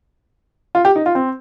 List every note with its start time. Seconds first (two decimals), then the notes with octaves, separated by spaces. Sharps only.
0.75 F4
0.85 G4
0.96 D#4
1.06 F4
1.15 C4